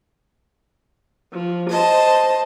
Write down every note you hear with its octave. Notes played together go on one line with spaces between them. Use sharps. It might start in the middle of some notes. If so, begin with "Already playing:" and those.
F3
C5 D#5 A5